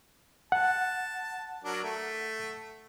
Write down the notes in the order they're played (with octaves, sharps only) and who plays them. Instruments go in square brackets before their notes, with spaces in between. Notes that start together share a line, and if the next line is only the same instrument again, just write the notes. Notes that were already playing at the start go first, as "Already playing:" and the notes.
[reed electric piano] F#5 [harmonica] A5
[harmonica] F#3 D4 A#4
A3